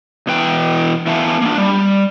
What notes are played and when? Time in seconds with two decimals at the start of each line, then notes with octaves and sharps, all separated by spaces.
0.27 B2 E3 B4 G5
1.07 E3 B3 E5 F5 G#5 A5
1.41 A#3 D4
1.58 G3